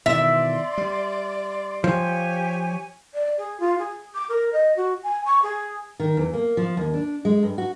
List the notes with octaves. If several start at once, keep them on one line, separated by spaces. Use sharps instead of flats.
B2 D#3 E3 D5 E5 C6
G3
F3 G4 C#5 G#5
D5
G#4
F4
G#4
D6
A#4
D#5
F#4
G#5
C#6
G#4
D#3
E2
A#3
F3
D#2
D4
G#3
G2
F#4